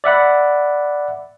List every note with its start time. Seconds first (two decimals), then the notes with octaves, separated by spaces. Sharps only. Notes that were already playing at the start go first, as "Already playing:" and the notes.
0.04 D5 E5 F#5 B5